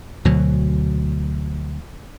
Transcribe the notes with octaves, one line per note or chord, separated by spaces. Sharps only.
D2 B2 F#3